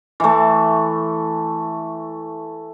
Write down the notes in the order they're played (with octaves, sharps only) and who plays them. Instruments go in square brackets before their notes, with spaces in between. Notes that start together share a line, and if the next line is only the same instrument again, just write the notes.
[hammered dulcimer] E3 A3